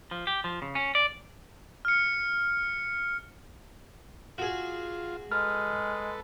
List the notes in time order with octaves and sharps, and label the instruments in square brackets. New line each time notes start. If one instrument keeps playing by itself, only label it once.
[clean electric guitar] F3
G4
F3
C#3
C#4
D5
[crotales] F6 C#7
[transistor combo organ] F4 [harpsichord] F#4 G#4
[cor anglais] G#3 [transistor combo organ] A4 B4 [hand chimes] F6